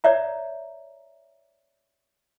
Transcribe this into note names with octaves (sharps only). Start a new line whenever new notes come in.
C#5 D5 E5 A#5